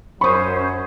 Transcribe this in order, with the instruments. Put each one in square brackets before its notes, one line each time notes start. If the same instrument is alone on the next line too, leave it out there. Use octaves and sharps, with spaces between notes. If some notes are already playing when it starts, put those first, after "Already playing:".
[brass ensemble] F#2 F#3 [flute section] C#4 C5 [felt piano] B5 D#6 [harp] C#6 D#7